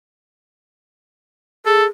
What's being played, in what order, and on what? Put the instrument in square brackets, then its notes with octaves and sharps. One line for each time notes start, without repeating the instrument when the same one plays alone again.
[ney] G#4 [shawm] A4